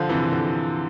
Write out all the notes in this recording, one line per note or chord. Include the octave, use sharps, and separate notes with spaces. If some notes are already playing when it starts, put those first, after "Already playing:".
Already playing: D3 F3
C3 E3
D3